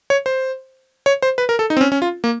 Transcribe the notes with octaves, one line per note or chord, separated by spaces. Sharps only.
C#5
C5
C#5
C5
B4
A#4
A4
D#4
C4
C#4
C#4
F4
A#3